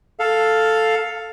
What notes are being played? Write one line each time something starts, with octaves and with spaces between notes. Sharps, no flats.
A4 F5